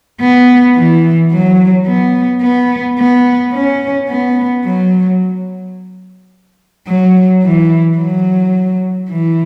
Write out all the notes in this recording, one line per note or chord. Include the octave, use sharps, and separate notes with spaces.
B3
E3
F#3
B3
B3
B3
C#4
B3
F#3
F#3
E3
F#3
E3